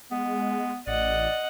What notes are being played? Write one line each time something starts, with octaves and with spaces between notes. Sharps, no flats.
G#3 B3
A1 D5 D#5 F#5